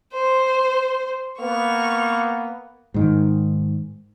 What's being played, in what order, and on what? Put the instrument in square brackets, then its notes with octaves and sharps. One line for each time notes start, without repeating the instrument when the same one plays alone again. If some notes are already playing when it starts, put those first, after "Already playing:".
[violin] C5
[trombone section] A#3 B3 [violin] C#6 F7
[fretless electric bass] G#2 D#3